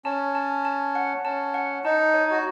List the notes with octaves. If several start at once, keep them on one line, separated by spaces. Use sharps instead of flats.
C#4 A5
A5
A5
F#5
C#4 A5
F#5
D#4 A5
C#5
F#4